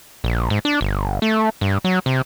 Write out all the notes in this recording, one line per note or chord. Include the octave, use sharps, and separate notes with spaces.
A#1
G#2
D4
G1
A3
G2
F#3
C3